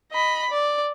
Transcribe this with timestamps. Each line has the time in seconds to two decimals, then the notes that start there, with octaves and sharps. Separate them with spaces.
0.12 D#5 B5
0.50 D5